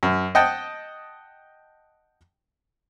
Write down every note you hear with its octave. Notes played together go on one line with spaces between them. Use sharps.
F#2
D#5 F#5 G5 A5